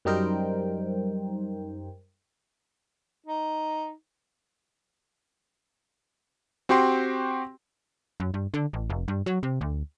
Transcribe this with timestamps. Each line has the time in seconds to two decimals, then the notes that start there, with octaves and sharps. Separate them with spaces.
0.05 F#2 G3 D#4 A#4 C5 G5
3.26 D#4
6.69 C4 F#4 G4 G5 C6
8.20 F#2
8.34 G2
8.54 D3
8.73 A1
8.90 F1
9.08 G2
9.26 F#3
9.43 C3
9.61 D2